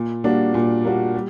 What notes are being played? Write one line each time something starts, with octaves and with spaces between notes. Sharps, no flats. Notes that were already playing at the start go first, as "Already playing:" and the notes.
Already playing: A#2
G3 A#3 D4 F#4
A#2
G3 A#3 D4 F#4
G3